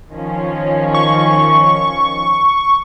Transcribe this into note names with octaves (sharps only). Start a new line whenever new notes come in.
D#3 F3 C#4
C#6